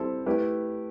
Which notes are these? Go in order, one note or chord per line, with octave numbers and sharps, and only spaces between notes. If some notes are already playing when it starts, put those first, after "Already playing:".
Already playing: G3 C4 E4 A4 C5
A3 E4 G4 B4